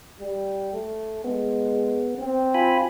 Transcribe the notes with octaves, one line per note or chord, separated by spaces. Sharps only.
G3
A3
G#3 B3
C4
F4 G#5 B5